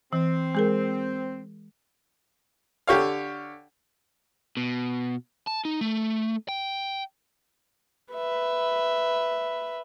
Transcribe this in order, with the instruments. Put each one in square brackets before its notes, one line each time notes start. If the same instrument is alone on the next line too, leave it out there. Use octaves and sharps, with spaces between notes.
[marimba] E3 [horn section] C4
[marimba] G#3 G#4 A#4
[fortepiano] D3 G4 C#5 F5
[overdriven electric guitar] B2
A5
D#4
A3
G5
[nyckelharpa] B4 E5